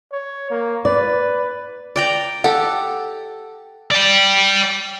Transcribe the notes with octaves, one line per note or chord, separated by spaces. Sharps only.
C#5
A#3
B4 D5
D5 G5 A#5
G4 A4 F#5
D5 G5